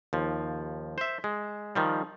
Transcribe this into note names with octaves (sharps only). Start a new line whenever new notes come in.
D#2 F3
C5 E5
G#3
D#3 F3 G3